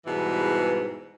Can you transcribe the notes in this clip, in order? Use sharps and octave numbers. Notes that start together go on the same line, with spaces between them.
E2 G#2 B2 E3 G3 E4